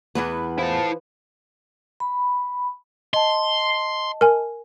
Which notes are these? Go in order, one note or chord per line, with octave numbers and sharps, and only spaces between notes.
E2 E3 B3 B4
F3 E4 A5
B5
D#5 A5 C6
A#4 G#5